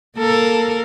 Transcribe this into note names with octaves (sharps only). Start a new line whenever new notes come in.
A#3 A4 A#4